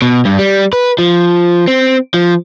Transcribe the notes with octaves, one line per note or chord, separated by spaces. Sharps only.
B2
G2
G3
B4
F3
C4
F3